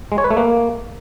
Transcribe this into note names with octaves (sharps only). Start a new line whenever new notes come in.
G#3
C#5
B4
A3
A#3